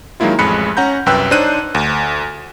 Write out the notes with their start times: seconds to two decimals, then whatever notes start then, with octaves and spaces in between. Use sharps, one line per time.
0.20 D#3 F#3 G#3 A#3 E4 F4
0.39 A1 F2 G#3 B5 F#6 C#7
0.77 C#4 F#5 A#5 G6
1.06 C2 F#2 B4 G5 E6 F#6
1.31 D4 D#4 C5 C#5 F#6 D#7
1.75 D2